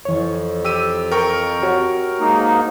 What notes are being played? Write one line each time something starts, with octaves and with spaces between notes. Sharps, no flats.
F2 E3 C#5
G4 E6 D#7
A#4 G5 C#6
F#4 G4 C#5
G#2 A#3 D#4